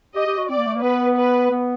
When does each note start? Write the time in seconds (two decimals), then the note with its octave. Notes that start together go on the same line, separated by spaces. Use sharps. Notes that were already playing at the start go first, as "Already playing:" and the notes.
0.15 G4 D#5
0.27 G4
0.38 F#4
0.49 C4 D5
0.58 A#3
0.66 A3
0.75 A#3
0.83 B3 B4
1.17 B4
1.51 B3